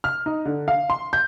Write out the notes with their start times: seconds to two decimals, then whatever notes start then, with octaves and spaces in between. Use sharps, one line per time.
0.04 F6
0.26 D#4
0.46 D3
0.68 F5
0.90 C6
1.13 G6